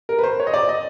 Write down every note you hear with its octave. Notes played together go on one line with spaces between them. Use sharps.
A#4
B4
C5
C#5
D#5
D5
D#5